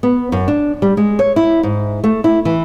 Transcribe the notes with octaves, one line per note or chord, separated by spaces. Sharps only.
B3
F#2
D4
G3
G#3
C#5
E4
G#2
A3
E4
E3